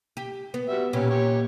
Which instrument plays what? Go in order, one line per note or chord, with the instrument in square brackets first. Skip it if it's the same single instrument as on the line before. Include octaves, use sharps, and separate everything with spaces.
[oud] G4
B3
[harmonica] G3 F#4 E5
[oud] A#2 [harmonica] C#4 G4 B4
[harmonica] G4 C#5